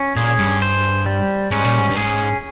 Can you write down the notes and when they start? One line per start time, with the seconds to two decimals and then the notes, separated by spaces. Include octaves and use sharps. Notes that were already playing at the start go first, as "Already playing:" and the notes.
Already playing: C#4
0.16 A#2 G#4
0.38 G2
0.62 C5
1.06 G3
1.51 G#2 C#4
1.64 A#2
1.79 G#2
1.90 G2
1.97 G#2 G#4